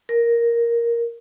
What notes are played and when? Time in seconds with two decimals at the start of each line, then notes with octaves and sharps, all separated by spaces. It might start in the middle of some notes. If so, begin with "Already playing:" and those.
0.09 A#4